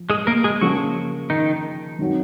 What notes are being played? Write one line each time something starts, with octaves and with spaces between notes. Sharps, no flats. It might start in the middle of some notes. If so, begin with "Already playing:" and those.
Already playing: F3
G#3 G#4
A#3 A#4
G#3 G#4
C#3 F3 F#3 A#3 F4 F#4 G#4
D#3 D#4
D#3 F#3 C4 F#4